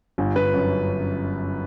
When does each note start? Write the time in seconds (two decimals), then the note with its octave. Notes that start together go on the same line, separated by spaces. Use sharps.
0.18 G1
0.36 G1 B4
0.54 F#2